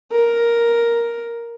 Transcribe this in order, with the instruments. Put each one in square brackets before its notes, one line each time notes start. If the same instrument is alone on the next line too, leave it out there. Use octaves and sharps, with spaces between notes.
[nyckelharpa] A#4